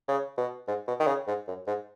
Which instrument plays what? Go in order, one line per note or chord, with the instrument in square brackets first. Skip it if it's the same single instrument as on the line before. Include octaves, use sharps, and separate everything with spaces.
[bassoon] C#3
B2
G#2
B2
D#3
C#3
G#2
F#2
G#2